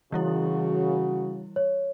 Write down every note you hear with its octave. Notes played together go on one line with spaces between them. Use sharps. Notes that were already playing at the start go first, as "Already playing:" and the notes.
C#3 E3 G3 E4 F#4
C#5